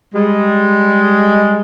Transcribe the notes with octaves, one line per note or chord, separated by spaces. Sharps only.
G3 G#3